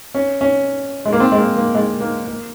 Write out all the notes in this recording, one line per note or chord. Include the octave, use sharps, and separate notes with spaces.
C#4
C#4
G#3
A#3
C4
G#3
A#3
A#3
G#3
A#3
A#3